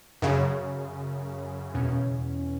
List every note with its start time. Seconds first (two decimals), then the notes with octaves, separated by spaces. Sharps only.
0.22 F#2 C#3
1.74 E2 B2 C#4